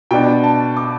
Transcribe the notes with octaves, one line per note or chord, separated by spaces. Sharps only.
B2 B3 D4 G5
A5
D6